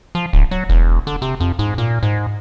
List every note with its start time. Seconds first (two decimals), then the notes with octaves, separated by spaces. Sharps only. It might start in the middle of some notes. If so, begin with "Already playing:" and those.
0.15 F3
0.33 D1
0.51 F#3
0.69 E1
1.07 D3
1.22 C3
1.40 F2
1.59 G#2
1.78 A#2
2.03 G#2